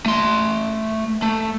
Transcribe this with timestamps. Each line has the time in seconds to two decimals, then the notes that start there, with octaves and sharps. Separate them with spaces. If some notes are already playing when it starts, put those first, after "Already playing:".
0.06 A3 C6
1.22 A3